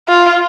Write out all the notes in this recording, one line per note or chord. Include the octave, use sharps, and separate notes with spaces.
F4